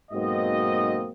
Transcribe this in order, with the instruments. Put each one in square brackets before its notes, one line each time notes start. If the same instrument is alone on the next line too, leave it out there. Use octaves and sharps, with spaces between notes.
[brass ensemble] B1 G#2 A#3 C4 F#4 D#5